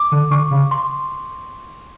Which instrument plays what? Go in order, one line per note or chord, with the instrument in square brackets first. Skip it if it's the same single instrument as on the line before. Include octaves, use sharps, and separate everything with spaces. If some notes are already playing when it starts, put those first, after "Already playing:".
Already playing: [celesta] D6
[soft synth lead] D3
[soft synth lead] D3 [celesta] C#6
[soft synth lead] C#3
[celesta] C6